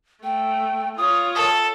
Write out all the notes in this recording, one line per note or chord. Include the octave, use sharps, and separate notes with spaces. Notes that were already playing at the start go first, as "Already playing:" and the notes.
A3 G5
F4 C#5 D#6
A4